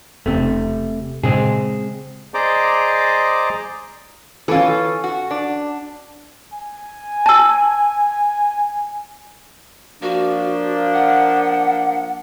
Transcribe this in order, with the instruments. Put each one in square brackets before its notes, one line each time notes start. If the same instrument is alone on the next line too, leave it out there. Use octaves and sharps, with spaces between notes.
[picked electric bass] E1 C4 [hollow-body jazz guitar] C3 A3
[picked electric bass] A#2 C#3 [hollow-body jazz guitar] G#3 C4 G#4
[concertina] G#4 C5 D5 D#5 A#5 D6
[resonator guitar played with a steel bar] E3 F4 [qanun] C#4 A4
[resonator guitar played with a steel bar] F#4
D4
[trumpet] G#5
[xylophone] A5 E6
[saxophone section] F3 A#3 D4 [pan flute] F#4
[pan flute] F#5